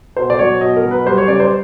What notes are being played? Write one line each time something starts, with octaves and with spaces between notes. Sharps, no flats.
B2 C5
D5
F#3 C#5
B2 D#5
A#4
F#3
B4
G3 C5
C#5
C#3 D5
C5